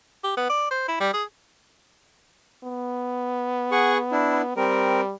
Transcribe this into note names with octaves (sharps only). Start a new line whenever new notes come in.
G4
B3
D5
C5
E4
G3
G#4
B3
G#4 F#5 C#6
D4 E4
G3 C4 A#4